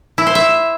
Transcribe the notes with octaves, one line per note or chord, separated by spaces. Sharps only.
E4
C5
E5